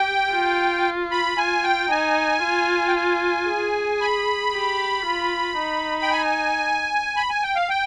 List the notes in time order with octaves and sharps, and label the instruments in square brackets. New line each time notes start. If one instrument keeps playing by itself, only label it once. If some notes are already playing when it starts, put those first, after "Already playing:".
Already playing: [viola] G4 [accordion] G5
[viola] F4
[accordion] B5
[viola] F4 [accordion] G#5
[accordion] G5
[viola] D#4 [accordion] G#5
[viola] F4
[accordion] G5
G#5
[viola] G#4
[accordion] B5
[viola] G4
F4
D#4
[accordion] G5
G#5
B5
G#5
G5
F5
G5